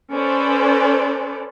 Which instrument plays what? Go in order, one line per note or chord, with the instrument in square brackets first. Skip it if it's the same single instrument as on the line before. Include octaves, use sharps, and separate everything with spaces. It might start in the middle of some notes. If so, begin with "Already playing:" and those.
[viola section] C#4 A4 B4 C5 D5